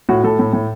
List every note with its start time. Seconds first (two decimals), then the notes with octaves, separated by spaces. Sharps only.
0.09 A2 F#4
0.24 A2 A4
0.39 A2
0.53 A2